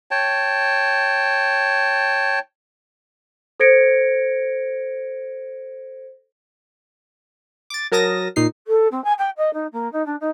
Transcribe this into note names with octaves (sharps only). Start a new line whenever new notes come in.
C#5 G5 A5
A4 C5 G#6 A#6 C#7 D7
D6 A6
F#3 A#4 A5 D#6 A#6
A#2 D#4 C7
A4
C4
G#5
G5
D#5
D#4
A#3
D#4
D4
D#4